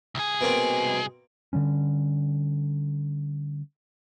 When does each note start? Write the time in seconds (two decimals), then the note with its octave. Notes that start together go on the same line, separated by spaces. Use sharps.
0.15 C2 G#4
0.41 B2 A#3 C4
1.53 D3 F#3 G3 C#4